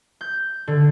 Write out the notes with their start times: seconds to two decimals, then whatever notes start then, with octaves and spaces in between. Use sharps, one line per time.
0.21 G6
0.67 D3